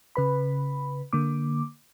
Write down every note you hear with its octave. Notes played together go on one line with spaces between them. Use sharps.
C#3 B4 B5
D3 A#3 D6